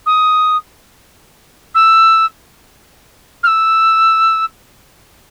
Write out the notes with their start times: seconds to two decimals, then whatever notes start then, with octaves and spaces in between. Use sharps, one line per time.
0.06 D#6
1.74 E6
3.43 F6
3.47 E6